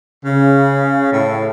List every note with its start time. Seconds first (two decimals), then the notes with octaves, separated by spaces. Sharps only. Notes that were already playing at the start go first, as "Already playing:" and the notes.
0.24 C#3
1.12 A2